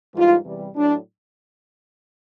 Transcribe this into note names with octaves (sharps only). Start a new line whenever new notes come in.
G#2 E3 G3 F4
E2 C3 E3 G3
A2 F#3 D4